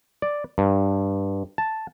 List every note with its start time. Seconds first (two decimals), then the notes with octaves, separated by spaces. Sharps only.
0.22 D5
0.58 G2
1.58 A5